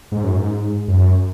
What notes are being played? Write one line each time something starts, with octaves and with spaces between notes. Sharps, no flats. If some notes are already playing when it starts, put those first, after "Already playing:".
G#2
F#2
G#2
F#2